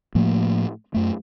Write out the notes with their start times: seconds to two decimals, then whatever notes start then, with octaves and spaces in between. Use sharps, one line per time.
0.15 A2 F3 A3 A#3
0.94 F#2 A3